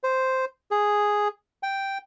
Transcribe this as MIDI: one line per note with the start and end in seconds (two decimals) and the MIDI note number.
0.04 0.45 72
0.71 1.28 68
1.63 1.98 79